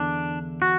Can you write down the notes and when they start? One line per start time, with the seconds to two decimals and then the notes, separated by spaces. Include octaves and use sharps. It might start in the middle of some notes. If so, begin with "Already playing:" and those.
Already playing: E2 D3 D4
0.62 F#4